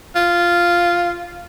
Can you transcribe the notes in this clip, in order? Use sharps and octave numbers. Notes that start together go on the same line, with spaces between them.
F4